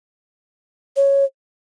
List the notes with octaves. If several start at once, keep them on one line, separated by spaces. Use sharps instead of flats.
C#5